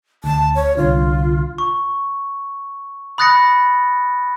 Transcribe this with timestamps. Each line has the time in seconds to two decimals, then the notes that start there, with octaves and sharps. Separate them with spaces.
0.24 D2 A5
0.55 C#5
0.77 C2 D3 F4
1.58 C#6
3.18 B5 D#6 F#6 A6 A#6 C#7